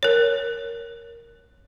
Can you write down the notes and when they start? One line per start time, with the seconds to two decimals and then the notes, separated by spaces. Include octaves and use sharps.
0.03 A#4 C#5